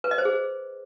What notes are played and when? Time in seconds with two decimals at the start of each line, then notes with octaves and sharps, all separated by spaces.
0.04 B4
0.11 D#5
0.18 C5
0.25 G#4